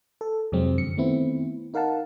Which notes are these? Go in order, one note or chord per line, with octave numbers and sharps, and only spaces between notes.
A4
F2 C3 F3 F#3 G#3 C4
F#2 D3 C#7
D#3 A3 B3 C4 E4
D#4 A#4 F5 F#5 A5